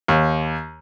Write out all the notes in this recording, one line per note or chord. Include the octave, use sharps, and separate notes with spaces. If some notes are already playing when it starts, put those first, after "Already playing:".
D#2